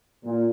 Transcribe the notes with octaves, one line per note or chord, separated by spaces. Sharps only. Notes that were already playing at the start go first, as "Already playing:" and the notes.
A#2